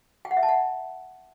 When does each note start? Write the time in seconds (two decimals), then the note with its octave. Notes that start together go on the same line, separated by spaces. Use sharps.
0.25 G5
0.31 F#5
0.37 E5
0.43 A5
0.49 F#5